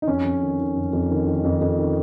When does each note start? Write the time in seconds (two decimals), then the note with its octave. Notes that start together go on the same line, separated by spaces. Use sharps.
0.02 D#4
0.07 F2 C#4
0.24 F2
0.42 D#3
0.59 D#3
0.76 F2
0.93 F2
1.10 D#3
1.27 D#3
1.44 F2
1.61 F2
1.79 D#3